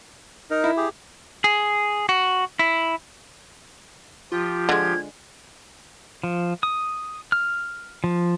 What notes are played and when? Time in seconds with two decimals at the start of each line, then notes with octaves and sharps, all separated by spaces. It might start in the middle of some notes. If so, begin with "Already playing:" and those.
0.51 D#4 A#4
0.64 E4
0.77 G4 G#4
1.44 G#4
2.09 F#4
2.59 E4
4.32 F3 F4 G4
4.69 D3 G#3 G#6
6.24 F3
6.63 D#6
7.32 F6
8.04 F3